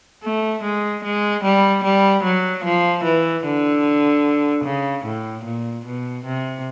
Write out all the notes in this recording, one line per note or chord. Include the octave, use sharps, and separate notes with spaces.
A3
G#3
G#3
G3
G3
F#3
F3
E3
D3
C#3
A2
A#2
B2
C3